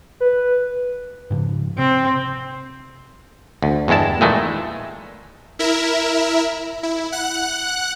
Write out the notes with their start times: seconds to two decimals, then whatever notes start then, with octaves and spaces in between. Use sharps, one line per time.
0.20 B4
1.30 G#2 C#3 F3
1.78 C3 C4
3.63 D2
3.88 E2 G2 G#3 E4 A5
4.21 A#2 D#3 E3 G#3 A3
5.59 E4 A#4 E5
6.83 E4
7.12 F#5 F#6